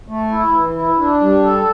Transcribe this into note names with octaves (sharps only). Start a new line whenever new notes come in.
A3
E4
E3
E4
D4
G3
A4